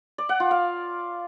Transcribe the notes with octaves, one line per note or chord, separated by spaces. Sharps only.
D5
F#5
F4
F5